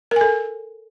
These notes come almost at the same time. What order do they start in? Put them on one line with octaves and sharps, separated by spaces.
A#4 G#5 A4